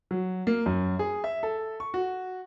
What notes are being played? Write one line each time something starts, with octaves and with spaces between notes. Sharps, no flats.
F#3
A#3
F#2
G#4
E5
A4
C#6
F#4